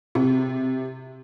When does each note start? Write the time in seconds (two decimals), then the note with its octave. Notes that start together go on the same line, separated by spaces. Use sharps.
0.15 C3